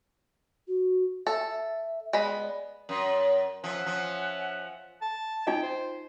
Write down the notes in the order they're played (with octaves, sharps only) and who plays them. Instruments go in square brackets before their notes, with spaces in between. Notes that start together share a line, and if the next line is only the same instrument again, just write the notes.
[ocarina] F#4
[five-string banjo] A4 [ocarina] E5
[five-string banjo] G#3 B3 B5 [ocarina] D5
[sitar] F#2
[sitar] F3 [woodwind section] C#4 E5 F#5
[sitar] F3
[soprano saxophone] A5
[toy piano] D#4 F4 D#5 [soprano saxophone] G5
[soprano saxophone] C5